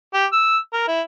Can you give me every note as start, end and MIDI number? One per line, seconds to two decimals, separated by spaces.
0.14 0.26 67
0.33 0.58 88
0.73 0.85 70
0.88 1.01 64